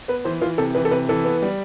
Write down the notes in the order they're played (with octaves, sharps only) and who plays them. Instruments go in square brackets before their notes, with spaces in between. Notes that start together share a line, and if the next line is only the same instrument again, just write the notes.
[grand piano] B3 B4
E3 C5
E3 F4
C3 A4
E3 B4
A4
C3 B4
E3 A4
B3
G3